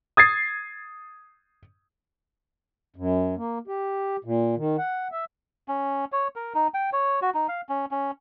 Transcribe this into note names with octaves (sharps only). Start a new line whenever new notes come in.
D#6 G#6 A6 C7
F#2
A#3
G4
A#2
D#3
F#5
E5
C#4
C#5
A#4
D#4
G5
C#5
F#4
D#4
F5
C#4
C#4